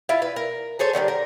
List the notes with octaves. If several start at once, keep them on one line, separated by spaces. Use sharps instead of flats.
E4 F4 E5
B4
A#4
G#4 A4 C5 C#5
D3 D#3 F3 G3
A#4